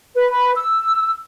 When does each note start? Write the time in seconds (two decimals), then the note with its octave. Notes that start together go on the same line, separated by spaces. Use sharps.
0.16 B4
0.55 E6